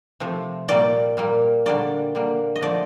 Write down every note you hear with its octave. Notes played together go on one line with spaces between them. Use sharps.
C3 F3 A3
A#2 G3 A#3 D5
A#2 G3 A#3
D3 G3 A#3 D5
D3 G3 A#3
D#5
D3 F3 A3 D5